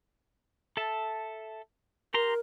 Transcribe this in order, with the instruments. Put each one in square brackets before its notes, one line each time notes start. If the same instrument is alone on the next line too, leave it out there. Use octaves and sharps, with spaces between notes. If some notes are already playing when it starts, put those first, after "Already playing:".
[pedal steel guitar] A4 E5 A5
[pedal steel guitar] G4 A#5 C6 [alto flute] A#4